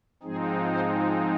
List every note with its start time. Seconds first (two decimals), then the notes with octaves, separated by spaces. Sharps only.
0.23 G#2 F3 G#3 C4 D#4 G#4
0.67 C5